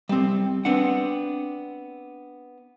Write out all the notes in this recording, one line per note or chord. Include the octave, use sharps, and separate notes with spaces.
G3 C4
B3 C4 D4 F#5